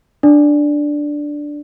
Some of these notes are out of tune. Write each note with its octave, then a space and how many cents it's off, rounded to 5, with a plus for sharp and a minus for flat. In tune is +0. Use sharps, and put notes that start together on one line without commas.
D4 +0 D5 +0